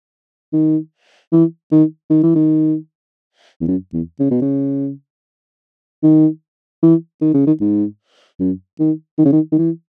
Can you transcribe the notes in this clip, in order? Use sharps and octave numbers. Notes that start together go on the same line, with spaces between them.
D#3
E3
D#3
D#3
E3
D#3
E2
F#2
E2
C#3
B2
C#3
D#3
E3
D#3
C#3
D#3
G#2
F#2
D#3
D#3
C#3
D#3
D#3
E3